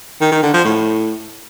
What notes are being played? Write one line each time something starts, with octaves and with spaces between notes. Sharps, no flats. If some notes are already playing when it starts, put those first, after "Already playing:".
D#3
D#3
D3
F3
A2